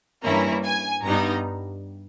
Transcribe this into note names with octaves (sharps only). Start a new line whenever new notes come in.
G2 E3 A#3 C#4 E4 A#5
G#5
G2 G3 B3 D#4 A#5